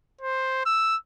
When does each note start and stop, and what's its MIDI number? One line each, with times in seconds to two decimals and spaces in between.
0.21 0.62 72
0.66 0.96 88